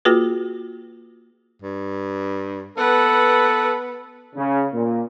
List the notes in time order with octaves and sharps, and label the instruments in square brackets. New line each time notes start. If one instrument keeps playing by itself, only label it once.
[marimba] A#3 F4 F#4 G#4 B4
[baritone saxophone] G2
[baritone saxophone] B3 [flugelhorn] A4 [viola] B4 F#5
[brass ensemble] C#3
A#2